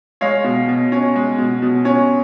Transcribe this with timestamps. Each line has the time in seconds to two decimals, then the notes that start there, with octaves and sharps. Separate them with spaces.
0.21 G#3 C#5 F5
0.44 B2
0.68 B2
0.92 C#4
1.16 G#3
1.38 B2
1.62 B2
1.85 C#4